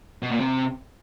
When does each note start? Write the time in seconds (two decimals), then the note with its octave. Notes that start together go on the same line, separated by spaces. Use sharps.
0.22 B2
0.31 A#2
0.40 C3